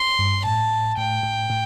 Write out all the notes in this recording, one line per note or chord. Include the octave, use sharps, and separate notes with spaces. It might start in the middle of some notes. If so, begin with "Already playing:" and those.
Already playing: C6
G2
A2 A5
A2 G5
A2
A2